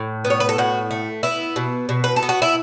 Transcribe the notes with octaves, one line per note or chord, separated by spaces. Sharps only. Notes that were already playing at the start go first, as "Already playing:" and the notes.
Already playing: A2
B3
C#5
B4
A4
A2 F#4
A3
B3 E4
B2
B2
B4
A4
B3
F#4
E4